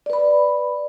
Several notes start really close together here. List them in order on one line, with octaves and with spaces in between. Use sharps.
D5 B4 B5